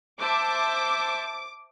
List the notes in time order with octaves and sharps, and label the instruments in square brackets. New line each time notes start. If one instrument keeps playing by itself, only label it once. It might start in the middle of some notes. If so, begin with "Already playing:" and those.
[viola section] C5 E5 A5 [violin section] D6